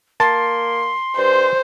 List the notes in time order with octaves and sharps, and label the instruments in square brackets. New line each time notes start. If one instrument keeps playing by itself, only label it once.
[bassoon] A#3 [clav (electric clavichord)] A5 [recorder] C6
[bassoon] G2 [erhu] C5